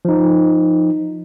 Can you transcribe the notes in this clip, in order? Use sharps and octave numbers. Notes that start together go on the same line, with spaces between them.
F3 D#4